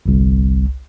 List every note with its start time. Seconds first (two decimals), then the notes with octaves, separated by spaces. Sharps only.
0.06 G1 C2